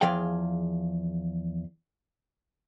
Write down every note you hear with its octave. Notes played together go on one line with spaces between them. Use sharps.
E2 F3 G#4 F5 G5